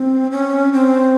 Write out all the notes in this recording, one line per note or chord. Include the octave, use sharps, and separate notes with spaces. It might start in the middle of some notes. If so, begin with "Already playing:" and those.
Already playing: C4
C#4
C4